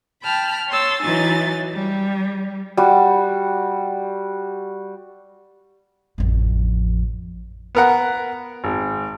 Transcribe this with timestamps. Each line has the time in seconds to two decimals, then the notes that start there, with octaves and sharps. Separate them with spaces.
0.24 G5 A5 B5 F6
0.69 C#5 C6 E6 A6
1.02 E3 F#3 D#4 G#5 A6
1.74 G3
2.77 G3 F#4
6.18 A1 F2
7.75 B3 A#4 F#5
8.64 G#1